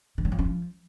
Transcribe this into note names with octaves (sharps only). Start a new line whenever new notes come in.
D#3
F#3
F3
C#4
F3